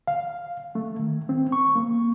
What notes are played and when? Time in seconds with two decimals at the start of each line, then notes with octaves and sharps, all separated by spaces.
0.07 F5
0.75 A3
0.99 D#3
1.29 C4
1.52 C#6
1.76 A#3